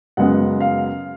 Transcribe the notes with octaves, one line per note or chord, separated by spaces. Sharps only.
F#2 C#3 G#3 B3 F#5
F5